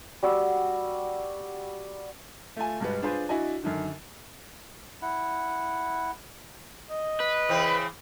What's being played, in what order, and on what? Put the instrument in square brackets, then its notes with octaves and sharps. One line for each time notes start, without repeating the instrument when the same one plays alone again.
[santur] G3 F#4 E6
[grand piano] A3 F4 G#5
G2 B2 G3 G#3 B3
D4 F4 G#4 B4 C5
D4 E4 F#4 D#5 G#5
F#2 D3 D#3
[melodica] E4 F#5
[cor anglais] D#5
[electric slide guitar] B4
[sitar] C#3 E3 C4